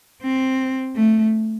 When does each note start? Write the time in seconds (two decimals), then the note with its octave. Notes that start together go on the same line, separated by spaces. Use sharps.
0.23 C4
0.96 A3